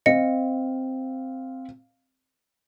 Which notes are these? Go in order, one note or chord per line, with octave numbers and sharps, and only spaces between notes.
C4 D#5 F5 C#7